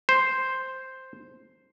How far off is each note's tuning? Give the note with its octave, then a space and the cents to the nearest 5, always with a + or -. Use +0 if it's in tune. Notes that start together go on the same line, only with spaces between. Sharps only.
C5 +0